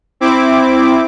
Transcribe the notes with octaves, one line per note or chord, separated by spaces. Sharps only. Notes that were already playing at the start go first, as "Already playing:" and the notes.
C4 E4 D6